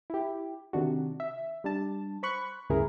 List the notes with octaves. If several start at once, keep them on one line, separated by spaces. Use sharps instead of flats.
E4 G4
C3 D#3 D4 F#4
E5
G3 D4 A5
C5 B5 C#6 F#6
D2 G2 C#3 E4 G#4 A#4